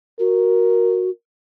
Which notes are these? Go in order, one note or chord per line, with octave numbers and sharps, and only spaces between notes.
F#4 A#4